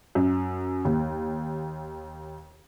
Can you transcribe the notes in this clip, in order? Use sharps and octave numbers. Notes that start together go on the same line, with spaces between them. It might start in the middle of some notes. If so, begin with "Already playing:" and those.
F#2
D#2